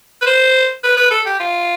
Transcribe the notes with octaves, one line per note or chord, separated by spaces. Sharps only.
B4
C5
B4
B4
A4
G4
F4